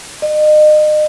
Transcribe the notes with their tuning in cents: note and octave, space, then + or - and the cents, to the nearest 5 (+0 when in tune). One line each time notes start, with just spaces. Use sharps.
D#5 -35